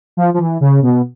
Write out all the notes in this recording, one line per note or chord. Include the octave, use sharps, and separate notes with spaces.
F3
F3
E3
C#3
B2